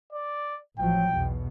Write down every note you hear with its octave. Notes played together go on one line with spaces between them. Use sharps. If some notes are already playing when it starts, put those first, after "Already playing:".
D5
A1 F3 F#3 G5
B1 E2 B2